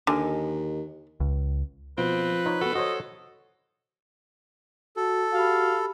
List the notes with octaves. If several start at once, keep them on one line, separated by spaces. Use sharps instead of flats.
D#2 D3 A#4 D#5 G#5
C#2
B2 F3 C4 B4
D#4 C5 C#5
B3 F#4 A4
F#4 C5 C#5 D#5
F#4 A4
F#4 G4 F5 B5